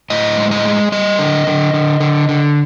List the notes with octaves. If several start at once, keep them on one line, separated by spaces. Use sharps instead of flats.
A2 D#5
G#3
D#5
G#3
G3 D#5
D3
D3
D3
D3
D3